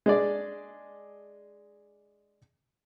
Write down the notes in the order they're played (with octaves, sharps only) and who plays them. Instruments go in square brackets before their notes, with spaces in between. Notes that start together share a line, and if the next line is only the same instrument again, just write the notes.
[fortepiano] G#3 D4 D5